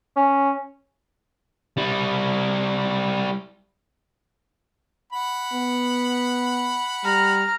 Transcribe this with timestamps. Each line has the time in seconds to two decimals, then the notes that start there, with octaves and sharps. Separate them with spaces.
0.16 C#4
1.78 G3 E4
5.13 F#5 B5
5.53 B3
7.04 G3 A#5 F6